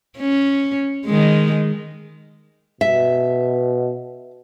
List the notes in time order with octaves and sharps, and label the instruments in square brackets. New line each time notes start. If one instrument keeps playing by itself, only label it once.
[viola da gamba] C#4
D#3 G#3
[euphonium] B2 [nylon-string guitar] E5